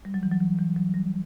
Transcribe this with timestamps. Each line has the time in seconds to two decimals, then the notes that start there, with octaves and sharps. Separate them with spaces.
0.05 G3
0.14 F#3
0.23 E3
0.31 F#3
0.41 E3
0.59 E3
0.76 F#3
0.94 G3